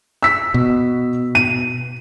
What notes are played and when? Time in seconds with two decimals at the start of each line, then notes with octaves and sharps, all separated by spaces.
0.23 E6 B6
0.54 B2
1.35 D#7